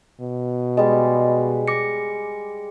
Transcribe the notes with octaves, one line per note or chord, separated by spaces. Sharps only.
B2
G3 G#3 D#5
D6 A#6 C#7